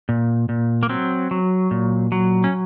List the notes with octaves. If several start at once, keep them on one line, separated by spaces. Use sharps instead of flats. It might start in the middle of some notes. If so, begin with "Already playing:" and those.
A#2
A#2
A#3
F#3 C4
F#3
A#2
F#3
C#4